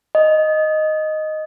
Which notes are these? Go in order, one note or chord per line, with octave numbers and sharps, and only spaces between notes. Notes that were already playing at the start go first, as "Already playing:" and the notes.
D#5